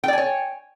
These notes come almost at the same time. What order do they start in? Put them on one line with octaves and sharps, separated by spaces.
G5 D5 G#5 C#5